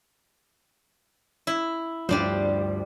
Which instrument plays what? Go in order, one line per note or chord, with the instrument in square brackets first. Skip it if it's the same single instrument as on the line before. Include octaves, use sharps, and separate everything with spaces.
[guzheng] E4
[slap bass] D2 G2 F3 [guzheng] G3 D4 C5